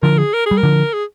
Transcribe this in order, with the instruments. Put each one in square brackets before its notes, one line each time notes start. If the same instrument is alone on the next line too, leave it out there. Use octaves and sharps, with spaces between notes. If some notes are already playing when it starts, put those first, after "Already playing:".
[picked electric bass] D3 F3 [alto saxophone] A#4
[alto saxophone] G#4
A#4
G#4
[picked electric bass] G3
[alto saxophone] A#4
[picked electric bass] D3 F3
[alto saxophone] G#4